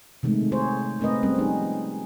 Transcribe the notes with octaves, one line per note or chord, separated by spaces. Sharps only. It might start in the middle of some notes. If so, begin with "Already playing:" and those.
C3 D#3 G#3 A3
G#4 C5 C#5
A3 C4 A#4 B4 D#5
G3 C4 C#4
F3 D#4 G#4